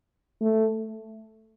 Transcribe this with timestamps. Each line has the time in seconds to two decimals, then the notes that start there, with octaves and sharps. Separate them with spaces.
0.41 A3